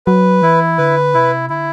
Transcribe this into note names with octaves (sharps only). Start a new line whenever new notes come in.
F#3 B4
E3 E4
D3 B4
C3 E4
D3 E4